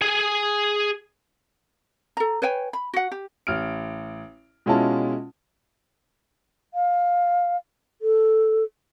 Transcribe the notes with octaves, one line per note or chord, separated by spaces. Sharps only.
G#4 G#5
A4 A#5
B4 C#5 G5 G#5
B5
F#4 F#5
G4
A1 F6 D7
B2 G#3 C#4 E4 F4 A5
F5
A4